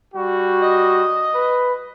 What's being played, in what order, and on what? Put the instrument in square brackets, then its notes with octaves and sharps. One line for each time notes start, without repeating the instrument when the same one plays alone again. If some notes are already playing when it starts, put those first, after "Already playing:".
[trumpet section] G3 F#4
[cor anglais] D#5
[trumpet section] B4